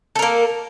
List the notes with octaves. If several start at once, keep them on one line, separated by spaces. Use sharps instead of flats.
A#3 A4 A#4